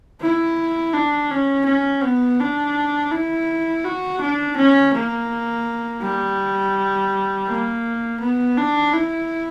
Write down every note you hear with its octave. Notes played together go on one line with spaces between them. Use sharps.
E4
D4
C#4
C#4
B3
D4
E4
F#4
D4
C#4
A#3
G3
A#3
B3
D4
E4